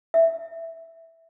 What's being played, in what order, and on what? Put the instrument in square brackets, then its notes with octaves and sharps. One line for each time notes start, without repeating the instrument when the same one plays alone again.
[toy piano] E5